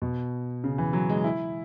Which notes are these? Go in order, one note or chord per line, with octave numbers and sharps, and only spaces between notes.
B2
C#3
E3
F#3
G#3
E4